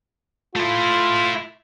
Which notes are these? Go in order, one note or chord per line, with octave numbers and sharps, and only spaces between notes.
A3 E4 F4